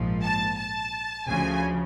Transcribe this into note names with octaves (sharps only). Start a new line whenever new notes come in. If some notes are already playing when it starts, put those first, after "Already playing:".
Already playing: A#1 G#2 F3
A5
A5
D2 C#3 F3 G#5